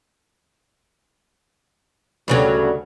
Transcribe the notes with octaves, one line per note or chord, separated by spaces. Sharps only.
D2 G2 C#3 F#3